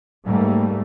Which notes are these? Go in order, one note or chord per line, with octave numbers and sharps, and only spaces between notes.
G#2 G3 A3 A#3